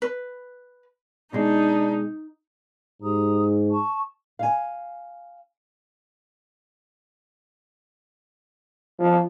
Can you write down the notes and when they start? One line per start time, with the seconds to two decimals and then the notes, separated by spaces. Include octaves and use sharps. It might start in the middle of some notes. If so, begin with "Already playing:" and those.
0.02 B4
1.33 B2 G#3 D4 D#4
3.02 G#2 G4 A#5 D#6
3.71 A5 C#6
4.39 F5 G#5
8.99 F3